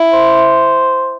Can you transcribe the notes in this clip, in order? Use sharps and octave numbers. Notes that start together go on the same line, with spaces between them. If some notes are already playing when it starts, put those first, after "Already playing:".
Already playing: E4
C5